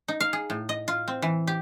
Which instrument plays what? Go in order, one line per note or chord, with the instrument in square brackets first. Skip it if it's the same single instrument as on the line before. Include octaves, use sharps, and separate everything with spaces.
[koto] D#4
F5
G#4
A2
D#5
F4
C4
E3
G4